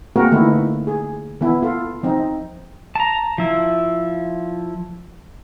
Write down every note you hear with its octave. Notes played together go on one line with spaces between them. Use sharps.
A#3 C4 F#4 G#4 A#4
D3 E3 A3 A#3 D#4 E4
G#4
E3 B3 E4
F4 A4
F3 C4 D#4
A5 A#5
F3 E4